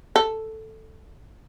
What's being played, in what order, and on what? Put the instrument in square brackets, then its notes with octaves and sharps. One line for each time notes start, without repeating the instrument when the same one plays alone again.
[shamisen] A4